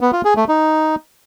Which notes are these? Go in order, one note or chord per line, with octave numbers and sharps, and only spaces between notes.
B3
F4
G#4
A3
D#4